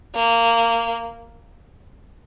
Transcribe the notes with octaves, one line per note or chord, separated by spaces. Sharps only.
A#3